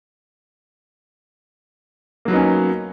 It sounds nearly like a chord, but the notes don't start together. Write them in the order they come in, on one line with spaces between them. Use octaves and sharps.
A#3 F#3 B3 D#4 C#4